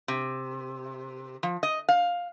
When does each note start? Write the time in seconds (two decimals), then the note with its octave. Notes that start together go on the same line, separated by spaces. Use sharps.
0.08 C3
1.43 F3
1.63 D#5
1.89 F5